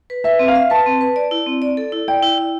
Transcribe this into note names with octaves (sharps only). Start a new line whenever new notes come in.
B4
B4 E5
C4
F5
E5
B4 A5
C4
B4
D5
E4
C4
D5
A4
E4
D5 G5
E4
E4